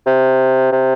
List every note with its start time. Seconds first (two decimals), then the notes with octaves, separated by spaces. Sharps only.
0.06 C3
0.72 C3